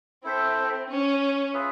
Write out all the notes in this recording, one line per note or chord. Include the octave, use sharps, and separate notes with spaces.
C4 E4 A4 C5 E5
C#4
F4 G#4 B4 E5